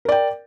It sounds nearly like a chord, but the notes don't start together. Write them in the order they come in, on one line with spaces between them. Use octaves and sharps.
A#4 D5 G5